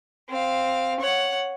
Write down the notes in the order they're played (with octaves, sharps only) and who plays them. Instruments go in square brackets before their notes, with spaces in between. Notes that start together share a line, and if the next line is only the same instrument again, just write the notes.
[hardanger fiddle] C4 F5
C#5 F#5